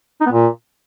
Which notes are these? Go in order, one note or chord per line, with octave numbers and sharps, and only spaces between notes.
D#4
B3
A#2